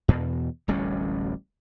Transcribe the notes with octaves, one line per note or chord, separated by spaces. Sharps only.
E2 B2
D1 A1 G3 C#4